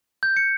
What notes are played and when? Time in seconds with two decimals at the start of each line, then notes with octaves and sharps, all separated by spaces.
0.23 G6
0.37 C#7